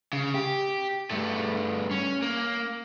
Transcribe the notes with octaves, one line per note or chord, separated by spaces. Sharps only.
C#3
G4
G2 A3
C#4
A#3